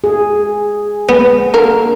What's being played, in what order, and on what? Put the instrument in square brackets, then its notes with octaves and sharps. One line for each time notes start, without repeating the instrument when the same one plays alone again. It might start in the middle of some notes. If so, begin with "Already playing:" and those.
[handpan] G#4
[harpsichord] B3
[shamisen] D3 A#3 A#4